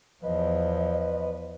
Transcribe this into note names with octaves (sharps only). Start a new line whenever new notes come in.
E2 F3 B4 D#5